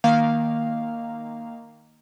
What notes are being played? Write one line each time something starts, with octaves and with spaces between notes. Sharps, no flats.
D#3 A#3 F5